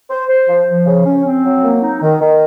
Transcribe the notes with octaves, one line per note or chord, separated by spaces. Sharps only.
C5
C5
F3
F3
C#3
C#4
C4
F#3
A#3
D#4
D#3
D#3